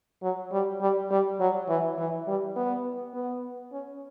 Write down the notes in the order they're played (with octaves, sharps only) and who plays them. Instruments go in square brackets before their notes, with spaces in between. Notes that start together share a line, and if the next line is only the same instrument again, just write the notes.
[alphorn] F#3
G3
G3
G3
F#3
E3
E3
G3
B3
B3
C#4